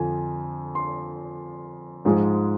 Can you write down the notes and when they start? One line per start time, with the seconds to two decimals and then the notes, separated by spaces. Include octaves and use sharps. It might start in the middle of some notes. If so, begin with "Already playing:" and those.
Already playing: F2 D3 F3 G#5
0.75 C6
2.05 G#2 F3 G#3